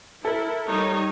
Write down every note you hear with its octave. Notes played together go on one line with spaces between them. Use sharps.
E4 A4 A#4
G3 D#4 C#5